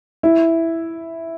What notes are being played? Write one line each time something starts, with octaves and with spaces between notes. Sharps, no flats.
E4